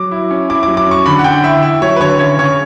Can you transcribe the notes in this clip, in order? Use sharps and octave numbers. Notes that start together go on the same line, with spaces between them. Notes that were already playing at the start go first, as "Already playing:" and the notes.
Already playing: F#3 D6
E4
C#4
E4 D6
F#3 D6
D6
C#4 C#6
D3 B5
F#5
D3 G5
E4 E5
E4 E5
F#3 C#5
B4
D3 C#5
C#3 C#5
C#3 C#5